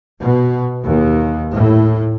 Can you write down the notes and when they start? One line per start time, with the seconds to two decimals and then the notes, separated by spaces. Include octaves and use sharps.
0.20 B2
0.83 D#2
1.54 A2